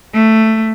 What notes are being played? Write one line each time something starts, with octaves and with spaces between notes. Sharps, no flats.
A3